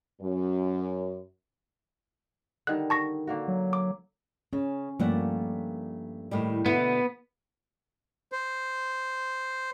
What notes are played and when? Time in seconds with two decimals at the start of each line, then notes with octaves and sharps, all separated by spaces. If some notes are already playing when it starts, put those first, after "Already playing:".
0.21 F#2
2.67 D3 D#3 G3 F#6
2.90 A5 C#6 A#6
3.27 D3 A#3 F#4
3.48 F#3
3.73 D6
4.53 C#3 C#4
5.00 G2 F3 A3 A#3 D5 F#5
6.31 A2 D#3 G3
6.66 B2 D3 B3 E4
8.32 C5